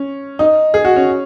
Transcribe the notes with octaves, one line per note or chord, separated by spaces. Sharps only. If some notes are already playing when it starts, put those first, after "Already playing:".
Already playing: C#4
D#4
G#4
F#4
C#4